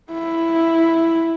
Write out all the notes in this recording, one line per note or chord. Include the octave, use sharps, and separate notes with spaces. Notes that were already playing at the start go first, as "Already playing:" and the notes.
E4